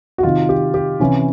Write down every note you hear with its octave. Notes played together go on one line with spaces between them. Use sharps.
F#4
C3 D#3 F4
G4
G4
C3 E3 C#4